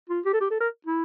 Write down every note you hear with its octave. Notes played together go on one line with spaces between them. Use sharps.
F4
G4
A4
G4
A4
A#4
E4